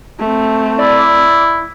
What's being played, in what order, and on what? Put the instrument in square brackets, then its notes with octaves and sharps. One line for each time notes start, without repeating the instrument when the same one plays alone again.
[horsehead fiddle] A3 C4
[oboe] E4 [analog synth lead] D5